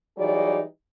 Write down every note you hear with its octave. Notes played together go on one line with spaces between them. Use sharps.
E3 F#3 G3 D#4 G#4 D5